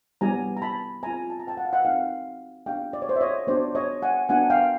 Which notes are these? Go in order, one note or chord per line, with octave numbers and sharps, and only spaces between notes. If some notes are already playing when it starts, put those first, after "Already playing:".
G3 B3 E4 G4 G#5 A#5
A#5
A5 B5
C4 F4 G#5 A#5
A5
A#5
G5 A5
F#5
F5
E5 F#5
C4 D#4 F#4 F5 G5
B3 D4 G4 F5 G5
D5
C#5
C5 D5
E5
C#5 D#5
B3 D4 F#4 C5 D5
C#5 D#5
F#5 G#5
B3 D4 F#4 F#5 G#5
F5 G5